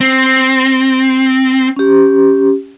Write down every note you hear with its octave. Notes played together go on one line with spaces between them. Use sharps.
C4
C#4 G4